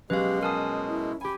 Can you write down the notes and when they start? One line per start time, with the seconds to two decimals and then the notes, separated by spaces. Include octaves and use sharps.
0.10 B2 F#3 G#3 C#4 G4 B4 F5
0.43 A#4 G#5 A5 D#6
0.88 E4
1.21 G4 G#5 B5